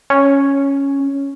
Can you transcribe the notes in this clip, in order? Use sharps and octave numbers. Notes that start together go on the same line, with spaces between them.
C#4